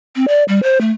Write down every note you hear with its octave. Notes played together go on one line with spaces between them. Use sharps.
C4
D5
G3
C5
A3